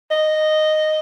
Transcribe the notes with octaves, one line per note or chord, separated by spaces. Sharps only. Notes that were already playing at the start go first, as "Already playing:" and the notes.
D#5